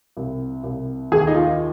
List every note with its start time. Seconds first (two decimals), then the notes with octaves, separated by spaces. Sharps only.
0.17 C2
0.64 C2
1.12 D#2 G#4
1.27 D#4
1.35 F4